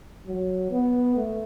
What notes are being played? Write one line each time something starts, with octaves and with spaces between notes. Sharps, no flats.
F#3
B3
A3